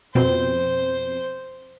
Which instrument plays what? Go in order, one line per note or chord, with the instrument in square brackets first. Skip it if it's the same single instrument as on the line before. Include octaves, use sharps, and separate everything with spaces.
[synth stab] F2 B2 C4 [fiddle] C5